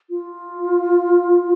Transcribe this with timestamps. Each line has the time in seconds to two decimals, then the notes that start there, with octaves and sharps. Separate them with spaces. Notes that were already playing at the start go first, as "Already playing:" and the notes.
0.10 F4